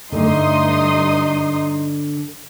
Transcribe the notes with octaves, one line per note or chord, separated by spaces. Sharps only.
G2 D3 A3 D#4 C6 D#6